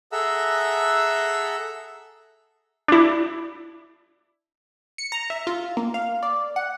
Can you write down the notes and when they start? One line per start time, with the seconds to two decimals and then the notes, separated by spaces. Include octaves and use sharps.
0.12 G#4 A4 E5 F#5 A#5 E6
2.88 D4 E4
4.98 C#7
5.12 A#5
5.30 E5
5.47 F4
5.77 A#3
5.94 F5
6.23 D5
6.56 F#5